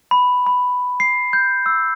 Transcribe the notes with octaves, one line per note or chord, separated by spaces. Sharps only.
B5
B5
C7
G6
E6